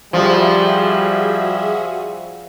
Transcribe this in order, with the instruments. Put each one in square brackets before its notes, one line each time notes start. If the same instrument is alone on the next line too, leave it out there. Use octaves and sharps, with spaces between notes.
[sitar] F3 [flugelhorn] G3 [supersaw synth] F#4 G#4 E5